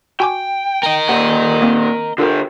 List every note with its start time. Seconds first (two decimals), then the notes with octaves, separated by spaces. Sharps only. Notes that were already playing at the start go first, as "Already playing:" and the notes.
0.20 F#4 G5 G#5 D6
0.83 A#4 D#5
1.09 A#2 G4 F#5
1.62 A#3 C4
2.18 D3 F4 G4 A4 A#4